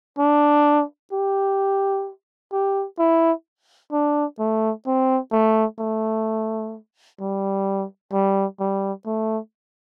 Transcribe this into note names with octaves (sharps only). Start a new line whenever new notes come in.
D4
G4
G4
E4
D4
A3
C4
A3
A3
G3
G3
G3
A3